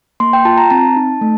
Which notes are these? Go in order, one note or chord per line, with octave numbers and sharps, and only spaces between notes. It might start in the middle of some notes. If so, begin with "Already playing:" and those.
A#3 C6
G5
F4 A5
A#5
C4 A5
D#4
A3